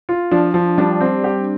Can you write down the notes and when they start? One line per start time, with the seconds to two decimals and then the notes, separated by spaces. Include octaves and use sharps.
0.09 F4
0.31 F3 D4
0.54 F3
0.78 G3 D4
1.00 C4
1.24 G4